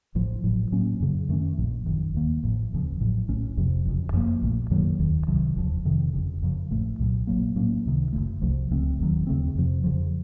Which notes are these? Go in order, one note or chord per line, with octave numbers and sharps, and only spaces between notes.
A1 A2 F3
A1 A2 F#3
A2 F#3 A#3 C#4
F#2 C#3 F#3
F#2 D#3 A3 C#4
A#1 A#2 F3
F#1 F#2 D#3
D#2 D#3 A#3
A1 A2 F3
F1 D#2 C#3 F3
A1 A2 F#3
A#1 A2 A3 C#4
F1 F2 C3 F3
F#1 F2 C#3
F#2 F3 A#3
A#1 A#2 A3
F#2 D#3 F#3 A#3
F1 D#2 D#3
C2 C3 D#3 F#3
F1 D#2 C#3 F3
F2 C3 D#3
F#1 F2 C#3
F#2 C#3 F3
A1 A2 A3
C2 A#2 F#3
A#1 A#2 F#3 A#3
A2 F#3 A#3 C#4
C#2 C3 D#3
F#1 F2 C#3 A3
C2 C3 F3 A3
C#2 C#3 A3 C4
F1 D#2 D#3 F#3
D#2 C#3 A3 C4
F2 C3 F3
F2 C#3 F3